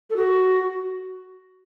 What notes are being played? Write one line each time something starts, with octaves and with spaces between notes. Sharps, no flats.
A4
F#4